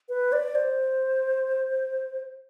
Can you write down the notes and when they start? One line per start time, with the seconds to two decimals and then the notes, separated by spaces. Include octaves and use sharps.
0.09 B4
0.33 D5
0.55 C5